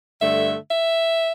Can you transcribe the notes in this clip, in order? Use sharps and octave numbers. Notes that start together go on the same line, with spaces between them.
G2 D3 A3 E5
E5